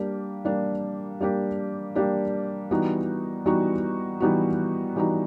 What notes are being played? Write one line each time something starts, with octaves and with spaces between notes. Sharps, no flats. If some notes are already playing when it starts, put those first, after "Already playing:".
Already playing: G3 A#3 D4 G4
G3 A#3 D4 G4
G3 A#3 D4 G4
G3 A#3 D4 G4
E3 G3 B3 D#4 F#4
E3 G3 B3 D#4 F#4
E3 G3 B3 D#4 F#4
E3 G3 B3 D#4 F#4